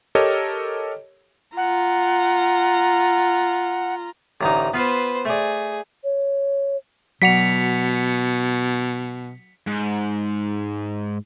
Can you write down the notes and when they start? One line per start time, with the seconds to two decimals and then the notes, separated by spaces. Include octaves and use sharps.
0.15 G4 A4 A#4 C#5 D#5
1.57 F4 F#5 A#5
4.41 A1 D2 D#4 A#5
4.74 B3 F4 B4 C5
5.25 A3 G#4 D5
6.04 C#5
7.22 B2 F#3 F#4 F#5 B6 C#7 F7
9.67 G#2